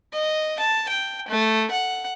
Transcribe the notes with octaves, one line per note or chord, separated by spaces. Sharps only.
D#5
A5
G5
A3
F#5